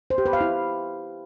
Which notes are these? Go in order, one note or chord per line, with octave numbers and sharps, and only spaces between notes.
C5
G4
B4
F5
E4